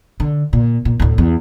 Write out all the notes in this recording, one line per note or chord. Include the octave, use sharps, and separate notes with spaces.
D3
A#2
A#2
D2 A2
E2